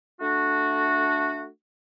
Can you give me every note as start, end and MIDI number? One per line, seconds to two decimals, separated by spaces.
0.21 1.47 57
0.21 1.47 62
0.21 1.47 66